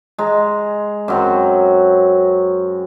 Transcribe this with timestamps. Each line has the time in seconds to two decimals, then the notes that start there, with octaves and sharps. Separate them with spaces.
0.18 G#3 A#5
1.08 F#2 F#3 C4